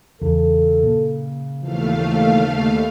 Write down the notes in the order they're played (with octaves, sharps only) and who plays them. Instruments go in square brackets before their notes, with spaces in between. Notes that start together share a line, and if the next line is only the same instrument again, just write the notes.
[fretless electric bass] E2 [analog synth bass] C#3 [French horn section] A4
[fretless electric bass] A#2
[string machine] D#2 A3 F5 [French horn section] B2 E3 F3